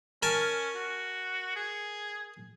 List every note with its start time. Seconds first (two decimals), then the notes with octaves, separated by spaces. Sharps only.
0.23 C#4 A#4 G#5 A5
0.76 F#4
1.56 G#4